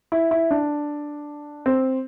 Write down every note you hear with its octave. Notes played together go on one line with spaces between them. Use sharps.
E4
E4
D4
C4